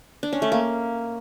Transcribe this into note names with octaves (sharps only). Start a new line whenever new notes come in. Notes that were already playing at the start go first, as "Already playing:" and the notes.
D4
C#4
A3
A#3